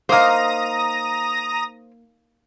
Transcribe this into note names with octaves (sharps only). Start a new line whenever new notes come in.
A#3 D#4 C5 F5 A#5 D#6 A#6